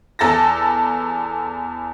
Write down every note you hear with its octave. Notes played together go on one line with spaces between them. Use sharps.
E2 A4 A5 A6 A#6